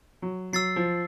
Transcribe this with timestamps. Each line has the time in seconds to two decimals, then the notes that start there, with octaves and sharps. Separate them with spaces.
0.22 F#3
0.53 F#3 E6 A6 C7
0.76 F3